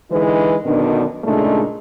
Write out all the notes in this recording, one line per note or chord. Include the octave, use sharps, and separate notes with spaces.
D3 E3 G#3 D#4 B4
F#2 B2 D3 D#3 D4
A#2 C#3 G#3 A3 D4 D#4